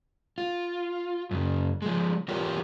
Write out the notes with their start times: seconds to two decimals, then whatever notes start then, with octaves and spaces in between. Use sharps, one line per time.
0.38 F4
1.31 F#2 C#3
1.82 F3 G#3
2.28 E3 F4 G4 A#4 C#5